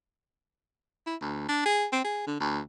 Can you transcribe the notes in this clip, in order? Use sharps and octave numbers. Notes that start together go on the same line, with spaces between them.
E4
D2
D4
G#4
C4
G#4
D3
D2